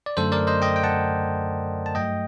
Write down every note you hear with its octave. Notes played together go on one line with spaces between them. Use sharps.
D5
F#2 D3 F#3 A3 A4 C5
A#4 D5
C5 D#5
D#5 G5
G5
F#5 A5
A5
G2 F#3 A3 D#5 G5